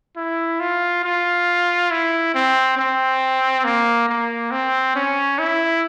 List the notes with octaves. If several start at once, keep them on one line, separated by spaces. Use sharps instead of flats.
E4
F4
F4
E4
C4
C4
A#3
A#3
C4
C#4
E4